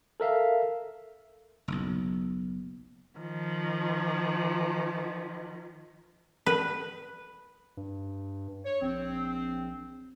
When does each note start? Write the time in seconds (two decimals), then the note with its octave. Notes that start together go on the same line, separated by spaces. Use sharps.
0.20 A4 A#4 E5 F5
1.68 F#1 B1
3.18 D#3 F3
6.46 B4
7.77 G2
8.65 C#5
8.82 A#1 C4